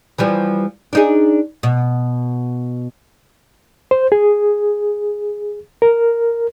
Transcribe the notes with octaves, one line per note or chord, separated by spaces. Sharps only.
E3 F3 G3
D4 D#4 G#4
B2
C5
G#4
A#4